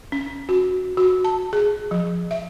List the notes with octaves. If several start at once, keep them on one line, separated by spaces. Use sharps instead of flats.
C#4
F#4
F#4
A5
G#4
F3
E5